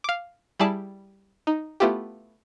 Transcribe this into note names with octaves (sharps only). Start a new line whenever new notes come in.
F5 D6
G3 E4 G#4 D5 A5
D#4
A3 B3 E4 F4 G4